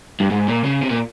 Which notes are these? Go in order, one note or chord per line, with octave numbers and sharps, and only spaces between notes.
G2
G#2
A#2
C#3
C3
A#2